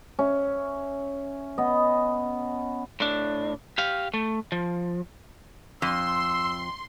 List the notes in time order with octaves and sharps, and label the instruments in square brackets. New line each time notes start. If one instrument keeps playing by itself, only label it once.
[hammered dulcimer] C#4 E5
B3 D#5
[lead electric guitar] A2 D4
G4 F5
A3
F3
[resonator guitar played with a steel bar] F2 [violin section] C6 [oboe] E6